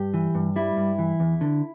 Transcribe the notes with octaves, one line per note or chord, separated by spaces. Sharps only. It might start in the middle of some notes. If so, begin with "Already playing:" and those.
Already playing: G2 G4
E3
G2
G3 E4
G2
E3
E2
D3